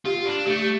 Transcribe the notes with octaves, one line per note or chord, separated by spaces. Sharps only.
F4 G4
D4
A3 G4